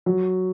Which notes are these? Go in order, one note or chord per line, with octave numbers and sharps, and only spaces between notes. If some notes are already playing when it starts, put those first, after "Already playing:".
F#3